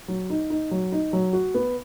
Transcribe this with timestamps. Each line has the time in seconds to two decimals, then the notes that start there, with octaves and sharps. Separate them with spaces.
0.08 F#3
0.30 D#4
0.50 D#4
0.71 F#3
0.92 D#4
1.13 F#3
1.33 F#4
1.54 B3